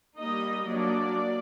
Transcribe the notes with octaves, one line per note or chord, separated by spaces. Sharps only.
G3 A#3 D#4 D#5
F#3 A#3 D4 D5